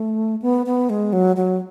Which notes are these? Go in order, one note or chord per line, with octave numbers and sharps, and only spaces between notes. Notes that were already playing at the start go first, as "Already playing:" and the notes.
Already playing: A3
B3
B3
G#3
F#3
F#3